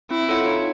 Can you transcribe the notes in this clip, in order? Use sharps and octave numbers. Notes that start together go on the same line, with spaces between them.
C4 E4
F4 A4 C#5 F#5
D#4